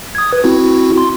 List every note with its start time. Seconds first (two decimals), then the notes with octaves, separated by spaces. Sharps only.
0.15 D#6 G#6
0.33 B4
0.44 C4 E4 F#4
0.98 C6